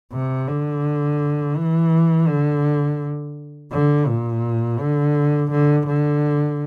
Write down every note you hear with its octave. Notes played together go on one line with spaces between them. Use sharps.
C3
D3
E3
D3
D3
A#2
D3
D3
D3